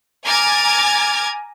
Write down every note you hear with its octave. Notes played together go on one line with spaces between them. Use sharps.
G#5 A#5 D6 F6 G#6 A6